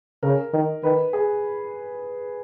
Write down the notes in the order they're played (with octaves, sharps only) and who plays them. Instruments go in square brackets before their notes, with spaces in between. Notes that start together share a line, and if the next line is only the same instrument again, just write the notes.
[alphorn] C#3 [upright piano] A#4
[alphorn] D#3
[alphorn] D#3 [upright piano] B4
[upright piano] G#4